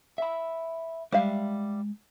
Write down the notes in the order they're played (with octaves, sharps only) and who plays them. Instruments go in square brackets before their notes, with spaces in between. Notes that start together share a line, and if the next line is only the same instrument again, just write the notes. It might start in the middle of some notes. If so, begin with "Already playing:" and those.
[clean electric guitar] E5 B5
[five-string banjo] G3 E5 F5 [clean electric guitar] G#3